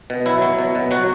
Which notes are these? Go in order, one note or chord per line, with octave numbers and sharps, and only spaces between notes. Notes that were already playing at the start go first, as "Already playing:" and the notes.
B2
F#3 E4
F#3
B2
B2
F#3 F#4